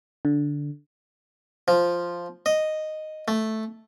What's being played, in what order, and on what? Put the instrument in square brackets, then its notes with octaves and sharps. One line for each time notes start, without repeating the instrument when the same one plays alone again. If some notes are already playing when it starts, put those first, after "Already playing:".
[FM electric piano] D3
[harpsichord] F3
D#5
A3